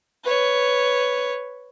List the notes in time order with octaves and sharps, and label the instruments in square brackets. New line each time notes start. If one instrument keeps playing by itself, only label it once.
[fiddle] B4 C#5